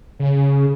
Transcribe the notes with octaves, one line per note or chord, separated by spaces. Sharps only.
C#3